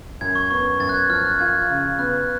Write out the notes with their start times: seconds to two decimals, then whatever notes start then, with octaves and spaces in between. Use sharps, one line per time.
0.21 F#2 G#6
0.35 C#6
0.50 B3 C#6
0.80 F#2 A6
0.89 F#6
0.94 G#6
1.09 F3 F6
1.25 F#6
1.39 F4 G#6
1.69 C#3
1.99 B3 F#6